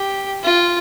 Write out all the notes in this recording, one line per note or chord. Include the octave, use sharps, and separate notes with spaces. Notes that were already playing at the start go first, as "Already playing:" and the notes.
Already playing: G4
F4